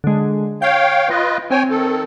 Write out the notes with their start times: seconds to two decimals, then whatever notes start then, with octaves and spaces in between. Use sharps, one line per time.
0.04 D3 G#3
0.62 C#5 F5 G5 G6
1.09 F4 B4 D#5
1.51 C4 C#5 G5 G#5
1.70 D#3 A4